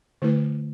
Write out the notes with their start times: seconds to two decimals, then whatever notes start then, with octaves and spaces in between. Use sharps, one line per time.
0.22 D3 A3 E4 B4